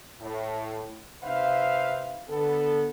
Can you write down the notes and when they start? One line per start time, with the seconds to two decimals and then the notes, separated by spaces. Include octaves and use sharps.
0.20 A2
1.24 C3 D#4 B4 C5 E5 F5
2.30 D3 B3 A4